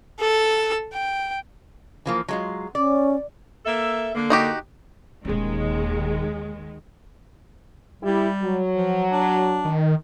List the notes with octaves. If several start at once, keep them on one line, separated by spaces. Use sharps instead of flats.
A4 E6
G5
E3 F3 A#3
F#3 G#3 F4
C#4 D5
A#3 A4 E5
D3 A#3
D#4 F#4 G4
D#1 D#2 D#3 G#3 C#4
G3 E4 G4
F#3
F3
D4
D#3